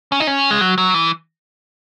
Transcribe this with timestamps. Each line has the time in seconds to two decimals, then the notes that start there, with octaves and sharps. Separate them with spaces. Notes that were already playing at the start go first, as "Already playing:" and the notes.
0.12 C#4
0.20 D#4
0.27 C#4
0.51 G#3
0.61 F#3
0.78 F#3
0.94 E3